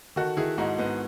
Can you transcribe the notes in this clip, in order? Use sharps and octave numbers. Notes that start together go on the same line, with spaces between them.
D#3 F#4 A4
D#3 E4 G#4
G#2 D#4 F#4
G#2 B3 D#4